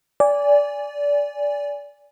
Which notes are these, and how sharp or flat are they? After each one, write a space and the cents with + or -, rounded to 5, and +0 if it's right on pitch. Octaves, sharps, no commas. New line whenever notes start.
D5 -20 G#5 -15